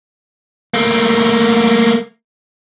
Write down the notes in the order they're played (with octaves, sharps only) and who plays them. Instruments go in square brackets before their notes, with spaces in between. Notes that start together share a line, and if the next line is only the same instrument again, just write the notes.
[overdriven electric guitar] A3 A#3